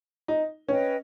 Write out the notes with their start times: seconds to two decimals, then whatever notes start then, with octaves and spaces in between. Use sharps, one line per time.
0.28 D#4
0.69 C#4 B4 D#5 G5